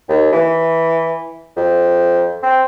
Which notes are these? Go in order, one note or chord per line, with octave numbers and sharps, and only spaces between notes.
D#2
E3
F2
C4